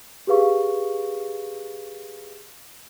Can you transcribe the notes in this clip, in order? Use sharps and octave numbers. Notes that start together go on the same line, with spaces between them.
G4 G#4 B4 F5 C#6